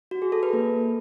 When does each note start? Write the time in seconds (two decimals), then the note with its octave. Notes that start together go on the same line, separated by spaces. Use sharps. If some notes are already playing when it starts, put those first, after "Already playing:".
0.11 F#4
0.22 G#4
0.32 A4
0.43 B4
0.53 A#3